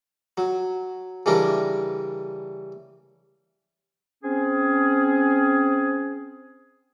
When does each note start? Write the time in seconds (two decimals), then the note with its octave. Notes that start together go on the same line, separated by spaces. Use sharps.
0.38 F#3
1.26 C#3 E3 G3 D4 A#4
4.24 C4 C#4 G#4